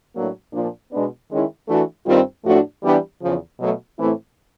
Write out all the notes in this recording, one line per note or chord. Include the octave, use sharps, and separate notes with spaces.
A2 F#3 A#3 D4
A#2 F3 A#3 D4
B2 G#3 B3 D4
D#3 G#3 C#4 E4
E3 A3 D4 F#4 A4
G2 D#3 G3 C4 F4
A2 F3 A3 D4 F#4
E3 G3 B3 D4 G4
E2 C#3 F3
B2 F#3 A3
A2 E3 A3 C4 E4